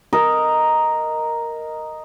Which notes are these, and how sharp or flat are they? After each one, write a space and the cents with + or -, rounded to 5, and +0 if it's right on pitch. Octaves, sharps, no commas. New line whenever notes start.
A#4 +0 D#5 +0